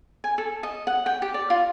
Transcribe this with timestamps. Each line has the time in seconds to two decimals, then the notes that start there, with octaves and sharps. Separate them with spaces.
0.24 G#5
0.38 A4
0.63 D#5
0.87 F#5
1.06 G5
1.22 G4
1.34 D5
1.50 F4